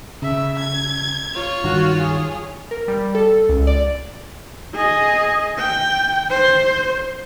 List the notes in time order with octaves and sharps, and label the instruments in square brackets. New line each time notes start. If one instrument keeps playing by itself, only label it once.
[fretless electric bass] C#3 [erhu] E5
[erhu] G#6
[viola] F4 C#5
[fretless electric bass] G2 D#3 [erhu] F#4
[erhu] G#4
[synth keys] A#4
G3
A4
C#2
D5
[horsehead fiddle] G#4 D#5
G5
C5